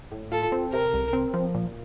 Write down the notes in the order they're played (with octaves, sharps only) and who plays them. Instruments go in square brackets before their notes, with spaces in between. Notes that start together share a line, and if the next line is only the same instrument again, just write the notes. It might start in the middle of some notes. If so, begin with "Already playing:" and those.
[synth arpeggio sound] A2
[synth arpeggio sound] F4 [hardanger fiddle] A4
[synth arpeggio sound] C4
[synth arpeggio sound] C3 [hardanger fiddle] A#4
[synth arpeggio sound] C2
C4
F3
A#2